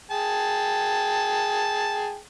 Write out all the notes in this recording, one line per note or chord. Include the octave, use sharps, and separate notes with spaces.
G#4 G5 A5